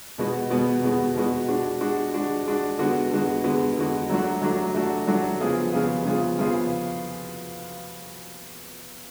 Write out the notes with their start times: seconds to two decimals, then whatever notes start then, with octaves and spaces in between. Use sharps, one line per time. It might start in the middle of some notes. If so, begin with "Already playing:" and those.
0.18 B2 G#3 B3 F#4
0.50 B2 G#3 B3 F#4
0.83 B2 G#3 B3 F#4
1.16 B2 G#3 B3 F#4
1.48 G#3 D4 F#4
1.81 G#3 D4 F#4
2.14 G#3 D4 F#4
2.46 G#3 D4 F#4
2.79 D3 G#3 B3 F#4
3.11 D3 G#3 B3 F#4
3.44 D3 G#3 B3 F#4
3.77 D3 G#3 B3 F#4
4.10 F#3 A3 D4 F#4
4.42 F#3 A3 D4 F#4
4.75 F#3 A3 D4 F#4
5.07 F#3 A3 D4 F#4
5.40 C#3 F3 B3 F4 G#4
5.72 C#3 F3 B3 F4 G#4
6.05 C#3 F3 B3 F4 G#4
6.38 C#3 F3 B3 F4 G#4